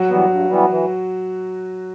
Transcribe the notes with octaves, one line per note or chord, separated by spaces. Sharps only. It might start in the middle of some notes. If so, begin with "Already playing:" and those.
Already playing: F#3 F#4
E3 G3 B3
G2
E3 G3 B3
E3